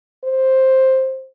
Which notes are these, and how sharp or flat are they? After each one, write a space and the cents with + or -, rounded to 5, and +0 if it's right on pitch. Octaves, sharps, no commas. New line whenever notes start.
C5 +10